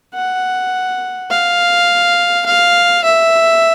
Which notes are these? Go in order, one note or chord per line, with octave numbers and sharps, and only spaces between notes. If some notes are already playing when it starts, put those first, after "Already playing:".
F#5
F5
F5
E5